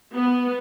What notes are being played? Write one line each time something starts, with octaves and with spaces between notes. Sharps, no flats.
B3